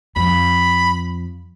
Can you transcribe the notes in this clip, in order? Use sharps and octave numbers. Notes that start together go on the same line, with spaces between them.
F2 B5